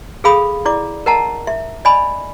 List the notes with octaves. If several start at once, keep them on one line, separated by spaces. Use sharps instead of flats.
G#4 A4 F5 B5 D#6
E4 D5 D6
A#4 D#5 F#5 A5 A#5
E5
D5 D#5 G#5 B5